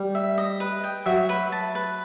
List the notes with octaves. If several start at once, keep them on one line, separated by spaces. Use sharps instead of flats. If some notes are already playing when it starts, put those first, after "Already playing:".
Already playing: G3
E5
D#5
B4
G5
F#3 E5
B4
A5
B4